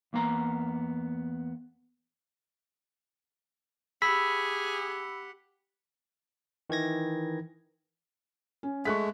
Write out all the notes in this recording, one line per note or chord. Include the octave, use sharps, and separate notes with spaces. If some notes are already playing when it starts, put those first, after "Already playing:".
E2 A#3 B3 A#5
G4 G#4 F#5 B5 E6 B6
D#3 E3 G#6 A#6
C#4
G#3 A3 C#6 F#6 B6